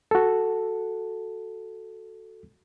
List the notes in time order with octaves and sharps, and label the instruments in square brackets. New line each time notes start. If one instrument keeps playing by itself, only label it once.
[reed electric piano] F#4 A4